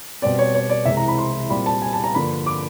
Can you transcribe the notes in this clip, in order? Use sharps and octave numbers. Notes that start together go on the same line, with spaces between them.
B2 G3 C4 D5
C#5
C#5
D5
C2 C3 E3 G#3 E5
A#5
B5
C6
A#2 G3 C4 B5
A5
G#5
A5
A#5
G2 D3 F3 A#3 B5
D6